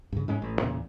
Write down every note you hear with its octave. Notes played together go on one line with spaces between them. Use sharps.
G2 C#3
G#2 G#3 C#4
A1
E2 A#2 C#3